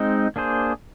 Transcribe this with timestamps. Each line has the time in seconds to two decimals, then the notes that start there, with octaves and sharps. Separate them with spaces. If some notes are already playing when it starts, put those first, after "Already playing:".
Already playing: G#3 C4 D#4
0.36 A#3 D4 G#4 C5